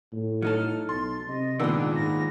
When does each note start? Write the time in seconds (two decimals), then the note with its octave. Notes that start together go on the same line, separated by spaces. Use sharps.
0.12 A2
0.42 F#3 D#4 A4 F6
0.89 B1 C6 A6
1.28 C3 D#5
1.60 A#2 D#3 G#3 B3 D4 E6
1.96 G#2 A#6